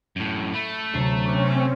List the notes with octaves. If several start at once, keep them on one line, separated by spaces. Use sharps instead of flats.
F#2 A2
A3 B5
D2 C3 F#3 C7
C4 C#4 C#6 D6 F#6